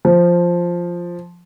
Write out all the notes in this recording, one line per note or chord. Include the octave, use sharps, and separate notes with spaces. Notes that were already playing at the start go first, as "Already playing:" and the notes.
F3